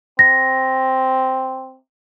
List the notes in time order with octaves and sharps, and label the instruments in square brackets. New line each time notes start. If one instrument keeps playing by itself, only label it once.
[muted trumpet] C4 [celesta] A#6